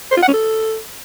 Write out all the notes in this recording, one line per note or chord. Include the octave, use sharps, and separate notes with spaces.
C5
F4
F#5
C#4
A4